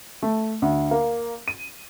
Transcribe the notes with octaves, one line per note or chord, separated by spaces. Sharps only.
A3
D2
A#3
D#7